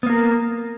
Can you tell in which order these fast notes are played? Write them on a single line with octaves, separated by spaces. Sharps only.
B3 A#3 A#4